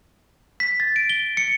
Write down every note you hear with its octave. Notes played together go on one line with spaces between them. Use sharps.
B6
A6
D7
G7
C#7